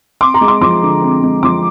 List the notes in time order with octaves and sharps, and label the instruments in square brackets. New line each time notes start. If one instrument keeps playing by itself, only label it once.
[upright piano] C4 C6 D6
A#5 C6
G#3
C6 D6
F3 C6 D6
D3
C4
G#3
F3 C6 D6